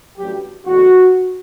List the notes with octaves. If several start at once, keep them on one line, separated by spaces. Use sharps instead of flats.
A1 G2 F#3 G4
F#1 E2 B2 A3 F#4